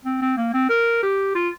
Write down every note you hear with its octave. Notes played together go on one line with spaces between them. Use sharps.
C4
C4
A#3
C4
A#4
G4
F4